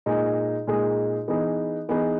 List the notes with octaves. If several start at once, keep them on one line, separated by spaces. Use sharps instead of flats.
A#2 G#3 D#4 G#4
A#2 G#3 D#4 G#4
E3 B3 D#4 G#4
E3 B3 D#4 G#4